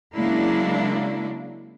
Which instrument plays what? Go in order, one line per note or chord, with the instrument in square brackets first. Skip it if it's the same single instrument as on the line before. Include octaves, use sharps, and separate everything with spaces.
[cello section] C#3 F#3 G#3 A#3 D4 E4